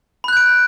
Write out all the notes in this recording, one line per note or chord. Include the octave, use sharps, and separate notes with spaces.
B5 F#6 G6 D7